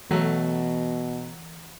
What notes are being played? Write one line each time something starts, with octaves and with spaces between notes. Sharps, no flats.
B2 E3 F#3 A3 F#5 A#5